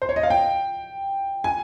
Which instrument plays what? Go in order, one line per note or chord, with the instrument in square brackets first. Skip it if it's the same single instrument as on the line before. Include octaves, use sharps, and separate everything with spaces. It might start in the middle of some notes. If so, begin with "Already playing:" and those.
[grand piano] C5
C#5
D#5
F5
G5
G#5